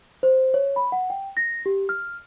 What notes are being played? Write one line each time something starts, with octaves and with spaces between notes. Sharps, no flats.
C5
C#5
B5
F#5
G5
A#6
G4
F6